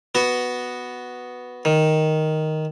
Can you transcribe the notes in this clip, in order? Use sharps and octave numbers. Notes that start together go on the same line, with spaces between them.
B3 F#4
D#3